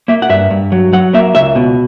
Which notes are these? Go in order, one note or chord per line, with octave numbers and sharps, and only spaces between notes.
A#3 E5
F#5
G2 E5
G2
F#3
F#3 F#5
A#3 E5
C#2 E5
B2